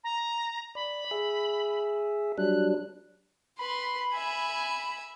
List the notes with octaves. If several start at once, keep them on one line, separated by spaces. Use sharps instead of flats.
A#5
D5 B5
G#4 E5
F#3 G3 D4 F#6
B4 B5 C6
E5 G#5